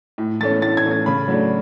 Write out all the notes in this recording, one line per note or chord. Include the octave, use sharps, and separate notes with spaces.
A2
E3 A3 C#4 A6
A2 A6
G#6
E3 A3 C#4
G#6
C#3 B5
F#3 A3 D4